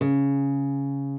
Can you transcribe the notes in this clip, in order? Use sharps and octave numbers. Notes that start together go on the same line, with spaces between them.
C#3